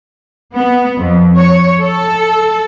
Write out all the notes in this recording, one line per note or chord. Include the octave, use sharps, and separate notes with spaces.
B3
F2
C#5
A4